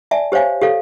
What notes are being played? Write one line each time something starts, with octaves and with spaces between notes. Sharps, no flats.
D5 E5 G#5 A5
G4 C5 C#5 F5 G#5
G4 A4 F5